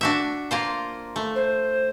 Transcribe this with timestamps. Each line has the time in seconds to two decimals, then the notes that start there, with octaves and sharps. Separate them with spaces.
0.01 D4 F#4 E5
0.51 A#3 F4 C5
1.16 A3
1.35 C5